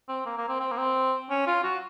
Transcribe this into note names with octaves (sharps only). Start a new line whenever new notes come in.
C4
A#3
A#3
C4
C4
A#3
C4
C#4
F4
F#4